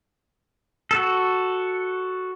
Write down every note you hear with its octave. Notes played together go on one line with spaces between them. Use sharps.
F#4 A4